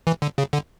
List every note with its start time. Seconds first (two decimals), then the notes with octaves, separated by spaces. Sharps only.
0.07 E3
0.22 D3
0.38 C#3
0.53 D3